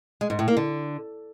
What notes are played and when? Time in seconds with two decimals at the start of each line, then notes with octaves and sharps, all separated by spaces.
0.21 G#3
0.30 G#2
0.39 A2
0.48 A#3
0.57 D3